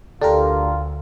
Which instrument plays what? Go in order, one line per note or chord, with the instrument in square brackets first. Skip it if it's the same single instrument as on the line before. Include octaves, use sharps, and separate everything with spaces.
[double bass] D2 [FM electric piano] D4 G4 A#4 [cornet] F4 [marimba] A4